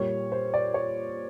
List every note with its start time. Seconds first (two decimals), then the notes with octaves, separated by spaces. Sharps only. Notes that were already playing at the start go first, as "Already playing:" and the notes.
Already playing: A#2 G3 C#5
0.32 C5
0.54 D5
0.74 C#5